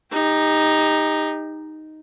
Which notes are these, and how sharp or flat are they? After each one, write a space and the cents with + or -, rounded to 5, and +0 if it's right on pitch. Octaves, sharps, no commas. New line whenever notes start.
D#4 +0 G4 +35